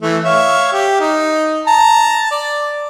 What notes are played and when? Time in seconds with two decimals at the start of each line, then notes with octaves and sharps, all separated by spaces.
0.02 E3 A3
0.24 C#5 E5 F5
0.73 G4
1.00 D#4
1.67 A5 A#5
2.31 D5